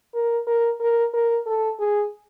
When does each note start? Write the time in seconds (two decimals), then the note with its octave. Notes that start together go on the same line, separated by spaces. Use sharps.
0.14 A#4
0.47 A#4
0.80 A#4
1.14 A#4
1.46 A4
1.79 G#4